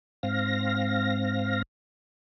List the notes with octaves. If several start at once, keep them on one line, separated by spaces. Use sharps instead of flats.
G#2 C4 F5 A#6